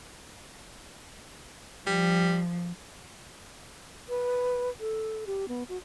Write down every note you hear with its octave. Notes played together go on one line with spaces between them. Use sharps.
F3 G3
B4
A4
G4
B3
F#4